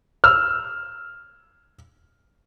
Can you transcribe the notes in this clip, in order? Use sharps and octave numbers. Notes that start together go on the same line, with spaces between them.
E6 F6